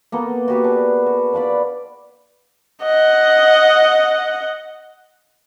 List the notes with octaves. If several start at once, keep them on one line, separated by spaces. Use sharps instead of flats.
A#3 B3 A4
F#4 G4 B4
D4 G#4 B4
F#4
D4 F4 D5 B5
D#5 F#5